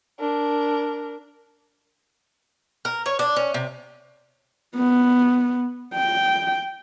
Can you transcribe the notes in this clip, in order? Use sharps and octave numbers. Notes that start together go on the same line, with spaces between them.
D4 A#4
A#4
C#5
D4
C#4
C3
B3
G5